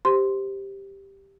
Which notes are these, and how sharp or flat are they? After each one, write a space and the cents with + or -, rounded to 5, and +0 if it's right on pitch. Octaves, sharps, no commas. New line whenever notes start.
G4 +0 C5 +0 C6 +0